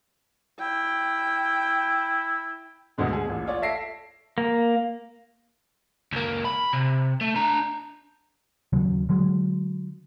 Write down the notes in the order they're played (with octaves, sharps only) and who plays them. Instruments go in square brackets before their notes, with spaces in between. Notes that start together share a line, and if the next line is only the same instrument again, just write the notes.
[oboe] E4 [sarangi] G5
[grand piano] D2 B2 D3 G#3
G#4
A1 A#2
F4 C#5 D5
A4 E5 A#6 C7 D7
[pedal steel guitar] A#3
[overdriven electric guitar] C#2 A#3
B5
C3
A3
D4 A#5
[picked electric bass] D#2 C#3 F#3
D3 F#3 G#3